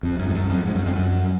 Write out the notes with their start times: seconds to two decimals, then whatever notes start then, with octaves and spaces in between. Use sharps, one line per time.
0.03 F2
0.19 F#2
0.29 G#2
0.35 F#2
0.50 F2
0.65 G#2
0.75 F#2
0.86 F2
0.96 F#2